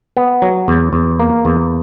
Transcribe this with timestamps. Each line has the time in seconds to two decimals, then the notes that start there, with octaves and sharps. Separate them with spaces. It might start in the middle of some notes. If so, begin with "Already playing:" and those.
0.17 B3
0.42 F#3
0.68 E2
0.93 E2
1.19 A#3
1.45 E2